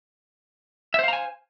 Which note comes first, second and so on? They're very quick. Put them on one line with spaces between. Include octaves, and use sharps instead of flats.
E5 C5 F5 A#5 G#5